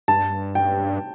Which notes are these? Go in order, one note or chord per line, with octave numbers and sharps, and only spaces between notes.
G2 A5
G5